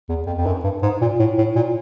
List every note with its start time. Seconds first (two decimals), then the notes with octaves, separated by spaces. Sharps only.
0.09 E2
0.27 F2
0.37 F2
0.46 F#2
0.64 G2
0.83 G#2
1.01 A#2
1.19 A2
1.38 A2
1.56 A#2